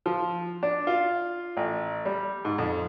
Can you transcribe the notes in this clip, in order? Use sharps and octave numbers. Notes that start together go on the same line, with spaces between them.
F3
D4
F4
A1
G3
G#2
F2